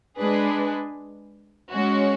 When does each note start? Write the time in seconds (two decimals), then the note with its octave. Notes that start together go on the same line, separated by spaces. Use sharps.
0.17 G#3 D4 G#4 B4
1.72 G#3 C#4 F#4